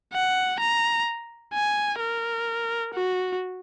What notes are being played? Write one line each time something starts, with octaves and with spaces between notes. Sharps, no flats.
F#5
A#5
G#5
A#4
F#4